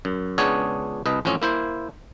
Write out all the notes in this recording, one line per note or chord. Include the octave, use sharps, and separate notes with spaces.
F#2
C#2 B3 D4 G#4 C#5
C2 B4 D#5
A1 F2 C4 C#4
A#3 E4 C5